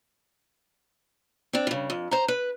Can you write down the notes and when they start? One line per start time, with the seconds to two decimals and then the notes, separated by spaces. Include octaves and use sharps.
1.53 C4 D4
1.67 G2 C#3
1.90 F2
2.11 C5 A#5
2.28 B4